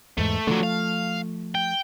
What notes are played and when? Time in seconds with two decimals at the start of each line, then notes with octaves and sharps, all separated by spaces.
0.18 E2 G#2 A3
0.47 D3 F3 F#3 A3
0.63 F5
1.55 G5